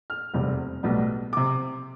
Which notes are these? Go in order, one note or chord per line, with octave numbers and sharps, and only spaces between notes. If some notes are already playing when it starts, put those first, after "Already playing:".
F6
F1 E2 C3 G3
B1 A2 G3 B3
C3 D6